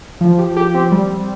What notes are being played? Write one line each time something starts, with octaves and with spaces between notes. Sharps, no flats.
F3
G4
G4
C4
G3
G3